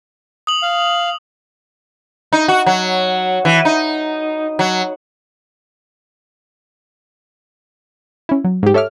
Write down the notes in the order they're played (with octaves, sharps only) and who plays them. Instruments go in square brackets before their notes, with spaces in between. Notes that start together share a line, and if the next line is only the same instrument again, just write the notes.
[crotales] D#6 F#7
[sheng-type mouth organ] F5
[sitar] D#4
F#4
F#3
E3
D#4
F#3
[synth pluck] C#4 E4
F#3
G#2 G4
A4 C#5 E5 D6 F6